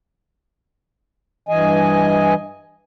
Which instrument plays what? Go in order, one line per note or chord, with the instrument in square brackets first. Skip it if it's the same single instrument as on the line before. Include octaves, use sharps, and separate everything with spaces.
[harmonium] G2 E3 D#5 G#5